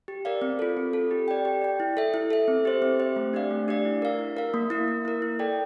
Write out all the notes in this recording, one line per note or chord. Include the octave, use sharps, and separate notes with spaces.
G4
A#4 D5 F5
C4
F4 A4
C4
F4 A4
G4
D5 G5
G4
D5 G5
E4
A4 E5
E4
A4 E5
C4
G4 C5 E5
C4
G4 C5 E5
A3
D4 G4 D5 F5
A3
D4 G4 D5 F5
E4
A#4 F5
E4
A#4 F5
A#3
E4 A#4
A#3
E4 A#4
E4
A4 D5 G5